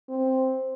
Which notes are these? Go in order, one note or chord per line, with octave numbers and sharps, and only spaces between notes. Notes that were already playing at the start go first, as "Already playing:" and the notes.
C4